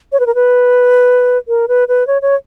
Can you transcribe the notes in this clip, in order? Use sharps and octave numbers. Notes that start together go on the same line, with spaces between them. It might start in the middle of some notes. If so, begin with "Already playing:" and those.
C#5
B4
A#4
B4
A#4
B4
B4
C#5
C#5